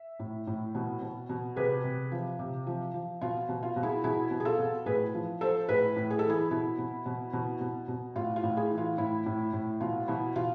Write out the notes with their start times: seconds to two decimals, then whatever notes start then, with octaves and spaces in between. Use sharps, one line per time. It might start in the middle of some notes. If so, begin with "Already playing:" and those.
Already playing: E5
0.19 A2
0.47 A2
0.75 B2
1.02 B2
1.29 B2
1.56 C3 G#4 B4
1.84 C3
2.12 F3
2.39 C3
2.67 F3
2.94 F3
3.21 B2 F4
3.49 B2
3.63 F4
3.76 B2
3.83 E4 G#4
4.04 B2 E4 G#4
4.31 B2
4.40 G#4
4.45 F4 A4
4.59 B2
4.86 A2 G#4 B4
5.14 F3
5.41 F3 A4 C5
5.69 A2 G#4 B4
5.96 A2
6.10 G#4
6.19 E3 A4
6.29 E4 G#4
6.51 B2 E4
6.78 B2
7.06 B2
7.33 B2
7.61 B2
7.88 B2
8.16 A2 F4
8.36 F4
8.43 A2
8.57 E4 G#4
8.71 E3
8.78 F4
8.98 A2 E4
9.26 A2
9.53 A2
9.81 B2 F4
10.08 B2 E4
10.36 B2 F4